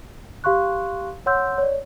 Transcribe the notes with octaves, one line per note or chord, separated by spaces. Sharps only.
G4 F5 C6 C#6 F#6
C#5 F#5 C6 E6 G6
C#5 D5